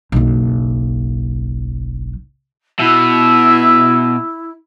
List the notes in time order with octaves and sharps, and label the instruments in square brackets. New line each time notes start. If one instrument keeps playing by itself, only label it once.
[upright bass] F#1 B1
[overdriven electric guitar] B2 [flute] E4 [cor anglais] E5